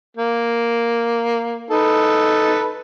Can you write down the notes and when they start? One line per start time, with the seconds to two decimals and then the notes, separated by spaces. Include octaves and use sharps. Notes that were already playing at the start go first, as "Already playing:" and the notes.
0.17 A#3
1.71 D#4 A4 B4